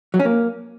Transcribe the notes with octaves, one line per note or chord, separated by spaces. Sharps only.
F#3
C#4
A#3